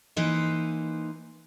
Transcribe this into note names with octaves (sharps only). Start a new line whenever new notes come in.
E3 A#3 D#4 B4 C5